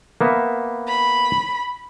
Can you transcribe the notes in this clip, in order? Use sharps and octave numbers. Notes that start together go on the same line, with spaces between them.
A#3 B3 E5
B5